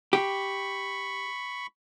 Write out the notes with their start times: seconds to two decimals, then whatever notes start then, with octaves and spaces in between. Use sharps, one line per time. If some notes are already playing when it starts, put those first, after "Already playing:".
0.13 G4 B5 C#6